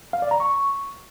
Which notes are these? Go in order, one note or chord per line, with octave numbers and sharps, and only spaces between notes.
F5
D5
A#5
C#6